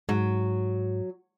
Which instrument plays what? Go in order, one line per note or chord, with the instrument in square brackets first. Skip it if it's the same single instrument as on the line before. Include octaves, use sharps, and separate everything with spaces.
[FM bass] G#2 [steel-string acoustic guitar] F#3